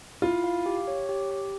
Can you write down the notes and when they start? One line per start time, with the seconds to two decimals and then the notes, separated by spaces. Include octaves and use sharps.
0.22 E4 F4
0.44 F5
0.66 G4
0.88 C#5
1.09 G4
1.31 G4